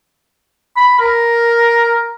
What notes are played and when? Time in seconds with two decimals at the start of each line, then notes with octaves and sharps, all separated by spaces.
0.76 B5
0.99 A#4